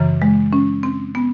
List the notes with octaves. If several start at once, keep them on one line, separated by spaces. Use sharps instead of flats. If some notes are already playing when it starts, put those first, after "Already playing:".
Already playing: F#2 C#3 E3
G#3
C#4
C4
B3